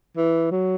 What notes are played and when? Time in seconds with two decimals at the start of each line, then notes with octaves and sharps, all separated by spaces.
0.17 E3
0.51 F#3